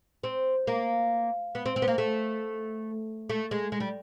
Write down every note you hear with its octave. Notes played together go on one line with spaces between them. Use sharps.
C4
A#3
B3
C4
C4
B3
A#3
A3
A3
G#3
G#3
G3